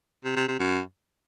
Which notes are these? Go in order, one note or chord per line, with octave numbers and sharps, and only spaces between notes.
C3
C3
C3
F#2